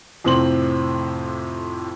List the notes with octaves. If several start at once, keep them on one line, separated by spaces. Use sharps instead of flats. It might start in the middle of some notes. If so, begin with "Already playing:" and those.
F2 A2 C3 C4 C6 F#7